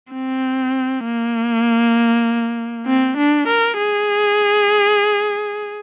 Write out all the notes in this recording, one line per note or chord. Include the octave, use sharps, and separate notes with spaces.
C4
A#3
C4
D4
A#4
G#4